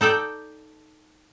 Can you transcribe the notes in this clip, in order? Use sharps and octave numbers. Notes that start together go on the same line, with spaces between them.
D#4 A4 D5 G5